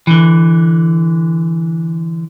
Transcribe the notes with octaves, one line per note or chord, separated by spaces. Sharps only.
D3 E3